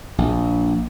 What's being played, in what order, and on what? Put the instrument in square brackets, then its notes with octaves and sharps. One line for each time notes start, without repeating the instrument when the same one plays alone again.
[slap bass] A#1